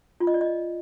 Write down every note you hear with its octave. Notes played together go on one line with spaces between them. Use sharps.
F4
D#5
D5
D#5